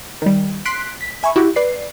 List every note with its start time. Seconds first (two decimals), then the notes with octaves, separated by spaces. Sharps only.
0.22 D#3 G3
0.65 C6 F#6 B6 C7 D7
1.01 B6
1.23 E5 G#5 B5 C#6
1.36 E4 F#4 G4
1.56 B4 D5 C7